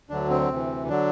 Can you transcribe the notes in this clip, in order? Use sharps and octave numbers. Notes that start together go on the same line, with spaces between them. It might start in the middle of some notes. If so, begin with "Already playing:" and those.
D2 D3 F#3 D4
C4
D2 C3 E3
D3 F#3 D4